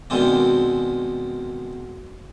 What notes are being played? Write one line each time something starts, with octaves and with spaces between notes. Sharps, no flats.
B2 D#3 G#3 C4 D4